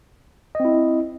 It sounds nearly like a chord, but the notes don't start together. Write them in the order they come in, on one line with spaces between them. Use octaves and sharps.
D#5 C4 E4